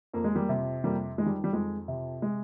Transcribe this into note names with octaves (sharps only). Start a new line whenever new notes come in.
F2 A#3
G#3
G3 A#3
C3
F2 G3 A#3
D#3 G#3
G3
G3
F2 G#3
C3
G#3